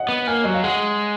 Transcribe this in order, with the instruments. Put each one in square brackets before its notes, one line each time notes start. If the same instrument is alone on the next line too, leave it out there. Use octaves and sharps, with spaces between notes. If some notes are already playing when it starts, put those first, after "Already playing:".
Already playing: [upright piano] D#5 F#5
[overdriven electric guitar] B3
[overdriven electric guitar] A#3 [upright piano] G#5
[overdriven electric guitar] F#3 [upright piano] D#5
[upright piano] F5
[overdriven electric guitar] G#3 [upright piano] F#5